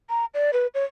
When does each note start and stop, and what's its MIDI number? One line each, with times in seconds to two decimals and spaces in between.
0.09 0.25 82
0.34 0.51 74
0.53 0.67 71
0.74 0.84 73